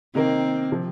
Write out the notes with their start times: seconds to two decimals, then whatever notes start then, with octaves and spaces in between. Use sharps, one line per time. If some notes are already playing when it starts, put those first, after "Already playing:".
0.15 C3 D#3 A#3 C4 D#4 A#4
0.72 C3 F3